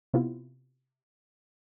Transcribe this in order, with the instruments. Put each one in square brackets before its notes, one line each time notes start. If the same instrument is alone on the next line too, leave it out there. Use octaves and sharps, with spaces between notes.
[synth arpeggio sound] C3 B3 E4 F4